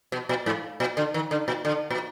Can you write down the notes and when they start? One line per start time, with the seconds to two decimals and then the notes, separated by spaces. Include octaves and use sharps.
0.12 B2
0.29 A#2
0.46 G#2
0.80 A#2
0.97 D3
1.14 D#3
1.31 D3
1.48 A#2
1.65 D3
1.90 A#2